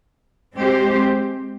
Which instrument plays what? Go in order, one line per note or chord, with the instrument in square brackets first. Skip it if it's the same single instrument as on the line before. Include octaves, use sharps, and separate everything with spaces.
[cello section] G#3 C4 G4 C5